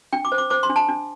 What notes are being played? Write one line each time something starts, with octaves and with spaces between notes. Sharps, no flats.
D4 G5
D6
C5
D6
C5 D6
C6
D4
A5
D4